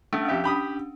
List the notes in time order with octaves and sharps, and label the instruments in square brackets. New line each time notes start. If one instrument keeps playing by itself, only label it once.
[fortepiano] A3 [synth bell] C#4 D4
[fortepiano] F2 G4 E5
G4 B5 D#6